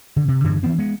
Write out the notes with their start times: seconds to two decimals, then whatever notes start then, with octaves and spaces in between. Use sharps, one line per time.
0.16 D3
0.28 C3
0.44 G2 D3 E3
0.63 E3 B3 C4
0.78 G#3 B3